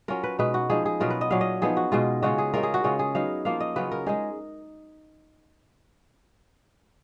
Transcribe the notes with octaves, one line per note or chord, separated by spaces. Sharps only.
F#3 C#4 F4 A#4
B4
B2 G#3 D#4 B4
F#4
F3 G#3 D#4 G#4
G#4
B2 F#3 B3 F4 A#4
B4
D#5
A#2 F#3 C#4 F5
D#5
F3 B3 D#4 G#4
F#4
B2 G#3 D#4 F4
C#3 G#3 C#4 F4 F#4
G#4
C#3 G#3 C#4 F4 A#4
G#4
F#4
C#3 G#3 C#4 F4
G#4
F#3 B3 D#4 F5
F3 A#3 F4 F5
D#5
C#3 F#3 C#4 F4 B4
A#4
G#3 D#4 G#4